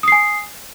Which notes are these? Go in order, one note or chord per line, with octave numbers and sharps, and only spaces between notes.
G#5 D#6 C7